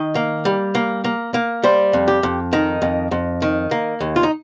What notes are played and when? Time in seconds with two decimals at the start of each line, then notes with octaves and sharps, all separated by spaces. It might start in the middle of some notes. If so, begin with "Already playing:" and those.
Already playing: D#3 D#5
0.15 A#3
0.45 G3
0.75 A#3
1.04 A#3
1.34 A#3
1.63 G3 C5
1.93 F2
2.08 G4
2.23 F2
2.53 D#3 D#4
2.82 F2
3.11 F2
3.42 D#3
3.71 A#3
4.00 D#2
4.16 F4
4.23 D#4